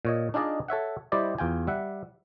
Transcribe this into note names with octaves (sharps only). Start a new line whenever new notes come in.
A#2 C#5 D#5
D4 D#4 F4 G#4 D5 D#5
A4 C#5 E5 F#5
G3 E4 G4 C5 D5 D#5
E2 F4 G5 G#5
G3 E5 F#5